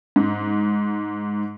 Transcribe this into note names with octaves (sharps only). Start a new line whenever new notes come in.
G#2